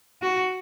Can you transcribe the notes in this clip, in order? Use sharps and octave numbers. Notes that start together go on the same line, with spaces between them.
F#4